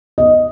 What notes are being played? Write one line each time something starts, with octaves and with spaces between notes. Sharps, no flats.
D#5